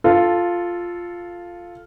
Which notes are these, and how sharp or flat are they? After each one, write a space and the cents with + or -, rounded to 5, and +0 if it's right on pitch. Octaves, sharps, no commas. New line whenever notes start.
F4 +0 A4 +0